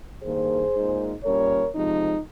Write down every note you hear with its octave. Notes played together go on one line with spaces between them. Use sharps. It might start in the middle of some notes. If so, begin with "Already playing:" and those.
G2 D#3 A#3 G#4 C5
A#2 G#3 D#4
A#2 G3 C#4 A#4 C#5
C3 F3 G#3 D#4